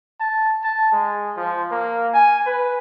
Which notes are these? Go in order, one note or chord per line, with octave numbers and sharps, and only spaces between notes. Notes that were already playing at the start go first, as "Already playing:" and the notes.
A5
A5
G#3
F3
A#3
G#5
B4